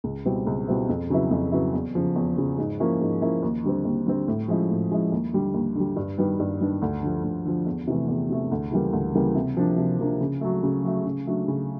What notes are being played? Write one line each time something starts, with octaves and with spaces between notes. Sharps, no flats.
C#2
B2 G3 C4 E4
C#2
B2 G3 C4 E4
F2
C#3 F#3 B3 E4
F2
C#3 F#3 B3 E4
E2
C#3 F3
E2
C#3 F3
G#2
F3 A#3 C#4 E4
G#2
F3 A#3 C#4 E4
D#2
D3 G3 C4
D#2
D3 G3 C4
A2
F3 G#3 C#4 E4
A2
F3 G#3 C#4 E4
D#2
D3 G3
D#2
D3 G3
G2
D#3 G3 B3 D4
G2
D#3 G3 B3 D4
D2
D3 F3
D2
D3 F3
E2
C3 E3 A3
E2
C3 E3 A3
D2
C#3 E3 G3 A#3
D2
C#3 E3 G3 A#3
C3
F3 A#3 D4
C3
F3 A#3 D4
C#3
F#3 A3
C#3
F#3 A3
C#3
F#3 A3 D4
C#3